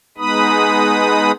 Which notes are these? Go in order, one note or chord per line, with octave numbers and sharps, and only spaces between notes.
G#3 B3 D#4 B4 B5 D#6